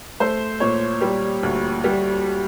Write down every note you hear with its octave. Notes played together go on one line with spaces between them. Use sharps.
A3 C5
A#2 C#5
G3
D2
G3